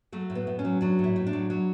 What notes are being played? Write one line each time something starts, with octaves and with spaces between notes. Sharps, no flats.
F#3 A3
A2
B3
A2
C#4
F#3
F#3 D4
A2 E4
A2
D4
F#3
F#3